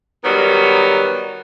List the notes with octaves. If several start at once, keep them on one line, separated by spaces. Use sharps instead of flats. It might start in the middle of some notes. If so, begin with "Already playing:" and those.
D#3 F#3 G3 B3